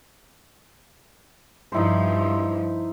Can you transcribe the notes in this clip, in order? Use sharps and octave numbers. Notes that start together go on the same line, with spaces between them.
G2 F3 D#4 E4 C5